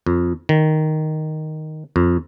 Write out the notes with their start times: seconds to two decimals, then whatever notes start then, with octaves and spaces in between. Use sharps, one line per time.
0.06 F2
0.49 D#3
1.96 F2